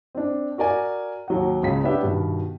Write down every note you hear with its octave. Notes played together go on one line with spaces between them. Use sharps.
C4 D4
F#4 A#4 D5 G#5
D#2 F#3 F#5
C#2 C#3 B6
B3 C#4 D4 G4 E5
G2 B2 D#3